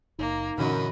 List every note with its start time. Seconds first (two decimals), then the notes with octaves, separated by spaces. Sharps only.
0.19 F#1 A#3 D#4
0.58 F#2 A#2 D3 E3 D#5 B5